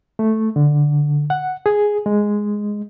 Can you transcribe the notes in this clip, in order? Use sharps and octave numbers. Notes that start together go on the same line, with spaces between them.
A3
D3
F#5
G#4
G#3